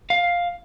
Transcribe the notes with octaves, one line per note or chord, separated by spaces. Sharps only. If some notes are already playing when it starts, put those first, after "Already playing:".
F5